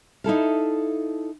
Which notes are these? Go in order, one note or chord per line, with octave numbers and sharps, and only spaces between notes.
D#4 E4 A4 F5